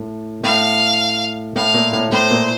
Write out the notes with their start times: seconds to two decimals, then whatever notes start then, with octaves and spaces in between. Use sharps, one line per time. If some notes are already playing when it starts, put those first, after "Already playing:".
Already playing: A2
0.43 A2 F5
1.56 A2 F5
1.74 A#2
1.93 A2
2.11 A2 C5
2.31 A#2